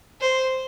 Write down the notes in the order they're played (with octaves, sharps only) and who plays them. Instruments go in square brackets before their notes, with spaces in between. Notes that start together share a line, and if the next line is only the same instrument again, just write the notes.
[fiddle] C5